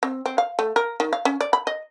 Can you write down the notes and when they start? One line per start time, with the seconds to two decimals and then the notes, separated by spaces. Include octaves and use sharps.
0.03 C4
0.26 C4
0.38 F5
0.59 A3
0.76 A#4
1.00 D#3
1.13 F5
1.25 C#4
1.41 D5
1.53 B5
1.67 D#5